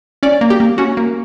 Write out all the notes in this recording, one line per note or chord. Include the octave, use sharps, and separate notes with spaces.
C#4 D5
A#3
G4
A#3
C#4 F#4
A#3